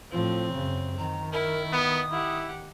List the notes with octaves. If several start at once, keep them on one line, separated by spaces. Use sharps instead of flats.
A2 F3 C4
F#2 C#3
D#3 A#5
E4 A#4
B3 D#6
E4 G4 F#5